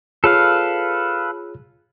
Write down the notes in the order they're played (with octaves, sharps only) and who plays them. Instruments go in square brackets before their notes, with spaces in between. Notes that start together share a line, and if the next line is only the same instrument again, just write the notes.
[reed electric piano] F4 G#4 C#5 [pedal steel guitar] A4 B4 F5